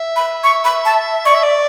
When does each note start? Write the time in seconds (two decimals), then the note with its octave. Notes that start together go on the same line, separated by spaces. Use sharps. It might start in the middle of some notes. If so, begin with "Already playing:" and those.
Already playing: E5
0.16 B5
0.44 C#6
0.65 B5
0.85 A5
1.26 D5 C#6
1.34 E5
1.43 D5